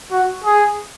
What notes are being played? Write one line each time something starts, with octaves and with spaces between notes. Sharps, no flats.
F#4
G#4